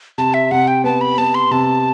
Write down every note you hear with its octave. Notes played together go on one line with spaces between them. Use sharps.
C3 A5
E5
C3 F#5
G5
B3 A5
B5
B3 A5
C6
C3 A5